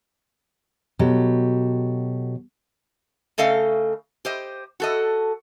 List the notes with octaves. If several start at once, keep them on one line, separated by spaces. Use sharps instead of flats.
B2 F#3 G4 A4
C#3 A3 A4 D#5 F5
G4 C5 D#5
F#4 A4 D#5